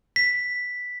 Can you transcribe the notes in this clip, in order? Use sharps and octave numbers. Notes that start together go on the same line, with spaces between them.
B6